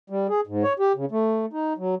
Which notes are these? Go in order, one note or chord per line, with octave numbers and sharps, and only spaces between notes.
G3
G#4
G#2
C#5
G4
C#3
A3
D#4
F#3